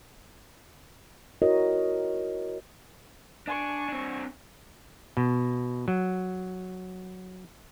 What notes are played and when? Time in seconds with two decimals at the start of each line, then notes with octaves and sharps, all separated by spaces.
1.42 E4 F#4 A#4 C#5 D#5
3.47 D4 G#5 C#6
3.88 C4 D4
5.17 B2
5.88 F#3